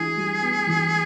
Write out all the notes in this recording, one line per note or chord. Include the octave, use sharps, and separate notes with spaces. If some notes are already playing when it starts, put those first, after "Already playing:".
Already playing: E3 E4 G#4
G3
B3
E3